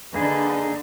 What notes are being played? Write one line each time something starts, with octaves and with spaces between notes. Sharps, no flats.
D3 A#3 D#4 G#4 B4 D#5